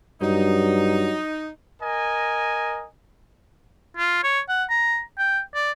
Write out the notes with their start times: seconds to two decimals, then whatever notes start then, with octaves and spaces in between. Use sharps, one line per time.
0.22 G2 F#3 D#4
1.81 A#4 D#5 G#5
3.97 F4
4.24 C#5
4.49 F#5
4.70 A#5
5.18 G5
5.55 D5